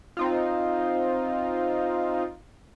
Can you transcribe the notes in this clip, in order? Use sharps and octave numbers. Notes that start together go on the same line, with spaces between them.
C4 D#4 F4